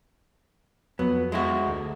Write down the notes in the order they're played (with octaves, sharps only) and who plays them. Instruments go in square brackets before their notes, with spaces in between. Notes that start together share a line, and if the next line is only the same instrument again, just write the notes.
[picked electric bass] F2 F#3 [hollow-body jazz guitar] B3
[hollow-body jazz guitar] G#3 E4 F#4
[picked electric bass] D2